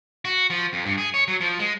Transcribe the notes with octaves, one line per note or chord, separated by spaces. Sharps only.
F#4
F3
F2
G2
G#4
C#5
F#3
F3
G#3